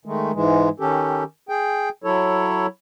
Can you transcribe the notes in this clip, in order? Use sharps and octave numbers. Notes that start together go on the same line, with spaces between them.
D#3 G#3 A3
G#2 E3 G#3
D#3 C#4 G4 A4
G#4 G5
F#3 E4 A4 C#5